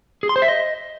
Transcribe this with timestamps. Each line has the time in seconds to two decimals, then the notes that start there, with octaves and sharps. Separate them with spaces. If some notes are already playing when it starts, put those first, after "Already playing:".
0.23 G#4
0.29 C6
0.36 C5
0.42 E5
0.48 D#5